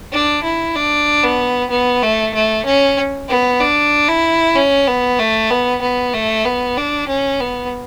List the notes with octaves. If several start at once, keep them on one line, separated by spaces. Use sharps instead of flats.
D4
E4
D4
B3
B3
A3
A3
C#4
B3
D4
E4
C#4
B3
A3
B3
B3
A3
B3
D4
C#4
B3